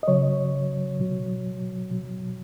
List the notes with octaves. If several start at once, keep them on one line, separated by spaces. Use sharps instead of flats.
D#5
C#3 F#3 C#5
B2 F#3
B2 F#3